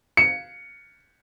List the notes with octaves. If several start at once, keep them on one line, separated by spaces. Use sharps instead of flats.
C#7